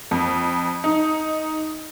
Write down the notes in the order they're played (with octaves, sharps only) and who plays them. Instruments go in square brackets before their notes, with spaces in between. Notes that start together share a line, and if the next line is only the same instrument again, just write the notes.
[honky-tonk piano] F2
D#4